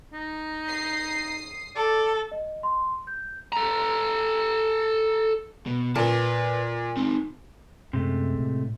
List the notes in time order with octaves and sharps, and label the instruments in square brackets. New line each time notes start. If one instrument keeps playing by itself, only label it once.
[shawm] D#4
[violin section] D#6 C7
[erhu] A4 [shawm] D5
[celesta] D#5
C6
G6
[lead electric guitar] A4 A#5
[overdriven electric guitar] B2
[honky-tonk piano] A#2 [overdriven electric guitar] B4 A5
[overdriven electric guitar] C4 D#4
[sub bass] F#2 [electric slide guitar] C3 G#3 A3
[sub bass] A2